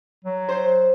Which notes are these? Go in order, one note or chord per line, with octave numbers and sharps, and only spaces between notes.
F#3
C5